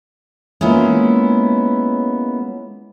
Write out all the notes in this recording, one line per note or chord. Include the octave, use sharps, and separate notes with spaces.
G#3 A#3 B3 C#4 E4 F4